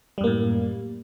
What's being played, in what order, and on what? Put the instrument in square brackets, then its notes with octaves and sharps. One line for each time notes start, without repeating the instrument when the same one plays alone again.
[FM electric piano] G3
F#2
A#3
A2